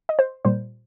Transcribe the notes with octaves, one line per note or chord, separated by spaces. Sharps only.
D#5
C5
A#2 G3 C5